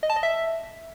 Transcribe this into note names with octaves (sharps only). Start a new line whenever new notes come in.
D#5
A5
D#5
E5